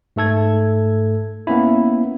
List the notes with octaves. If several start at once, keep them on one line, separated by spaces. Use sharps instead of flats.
G#2 A3 A4 G#6
A#3 B3 C#4 E4